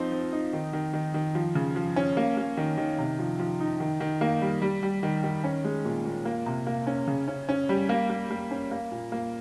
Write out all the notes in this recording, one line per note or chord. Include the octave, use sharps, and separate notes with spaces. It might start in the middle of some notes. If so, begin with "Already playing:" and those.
Already playing: F3 C4 D#4
C4
D#4
D#3
D#3
D#3
D#3
F3
C#3
F3
C#4
A#3
A#3
D#3
D#3
C3
F3
F3
D#4
D#3
D#3
A#3
G3
G3
G3
D#3
D#3
C#4
G#3
A#2
A#2
A#3
C3
A#3
C#4
C#3
C#4
C#4
G3
A#3
A#3
A#3
C#4
A#3
A#2
A#3